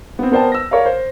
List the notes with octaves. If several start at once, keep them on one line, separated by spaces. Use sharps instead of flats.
B3 C4
B3 A#4 C5 D5 G5 A5
E6 A#6
A#4 C#5 D5 F5
C5